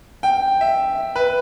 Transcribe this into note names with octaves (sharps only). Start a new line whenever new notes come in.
G5
E5
B4